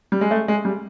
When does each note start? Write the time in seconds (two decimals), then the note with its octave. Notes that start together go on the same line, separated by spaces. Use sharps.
0.12 G3
0.21 G#3
0.31 A3
0.48 G#3
0.65 G3